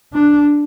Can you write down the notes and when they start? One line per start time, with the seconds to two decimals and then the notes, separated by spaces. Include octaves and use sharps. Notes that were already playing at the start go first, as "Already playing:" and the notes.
0.14 D4